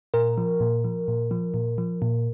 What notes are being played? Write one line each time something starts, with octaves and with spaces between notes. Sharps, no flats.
A#2 A#4
F3
A#2
F3
A#2
F3
A#2
F3
A#2